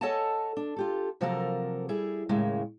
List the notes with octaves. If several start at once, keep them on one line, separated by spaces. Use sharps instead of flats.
A4 C#5 D#5 F#5 G#5 A5
D4
F4 G4 A4
C3 F3 F#3 A#3 A4 A#4
G3 E4 G#4
D#2 A2 C#3 G#3 A#3